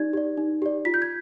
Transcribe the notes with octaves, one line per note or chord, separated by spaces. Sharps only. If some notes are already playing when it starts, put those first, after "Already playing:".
Already playing: D#4 G4 D5 G#6
G4 D5
D#4
G4 D5
F4 B6
G6
G#6